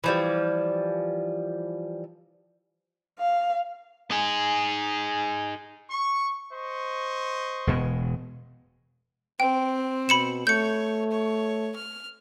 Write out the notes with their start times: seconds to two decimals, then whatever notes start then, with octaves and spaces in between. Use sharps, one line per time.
0.04 E3 F3 G3
3.19 F5
4.11 D#4 G#4
5.90 C#6
6.53 C5 D#5 C#6
7.67 E1 B2 G#3
9.40 C4 G5
10.09 B2 B5 C#7 E7
10.47 A3 C#5 G6 C#7
11.11 C#5
11.76 F6